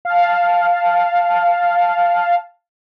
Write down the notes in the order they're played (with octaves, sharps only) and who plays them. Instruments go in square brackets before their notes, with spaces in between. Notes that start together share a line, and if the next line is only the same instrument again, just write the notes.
[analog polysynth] F5 A5